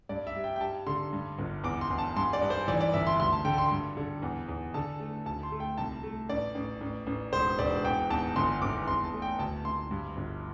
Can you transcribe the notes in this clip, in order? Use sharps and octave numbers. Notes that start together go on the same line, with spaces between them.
G2 D5
E5
G3
G5
G5
G3 A5
D3 C6
G2
G1
E2 D6
C6
E2
A5
G2 C6
D5
G2
C5
E3 D5
D5
G1 E5
C6
D2 C6
A5
D3 G5
C6
G2
D3
E2
E2
D3 A5
A3
D2 A5
C6
A3
G5
C2 A5
A3
A1 D5
A1
A1
A1
E1 C5
E1 D5
E2 G5
E2 A5
G1 C6
G1 D6
E2 C6
A5
A3
G5
D2 A5
D2 C6
G2
G1